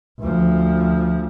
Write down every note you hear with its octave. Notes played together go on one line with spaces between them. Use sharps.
D2 F3